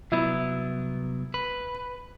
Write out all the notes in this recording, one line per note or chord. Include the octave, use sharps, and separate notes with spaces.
C2 F#3 B3 E4
B4